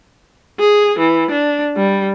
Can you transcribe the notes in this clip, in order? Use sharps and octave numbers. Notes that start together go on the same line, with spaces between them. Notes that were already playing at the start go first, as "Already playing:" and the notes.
G#4
E3
D4
G3